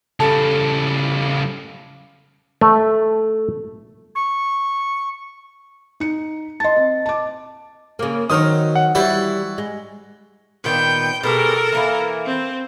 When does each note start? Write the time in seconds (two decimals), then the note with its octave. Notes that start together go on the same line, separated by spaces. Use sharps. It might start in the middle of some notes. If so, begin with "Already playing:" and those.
0.20 C#3 G3 A4 A5
2.61 A3
4.15 C#6
6.00 D#4 C#7
6.60 D#5 A5 C6 A6
6.76 C4
7.06 A5 D6
7.99 C#3 A#3
8.30 D#3 F#3 D#4 C5 C#5 D#6 F6
8.76 F#5
8.95 E3 G3 E4 F#4 D5
9.58 G#3
10.64 A#2 D#3 B3 G5
11.23 B2 G#3 G4 A4 A#4
11.72 E3 A#3 E4
12.26 C4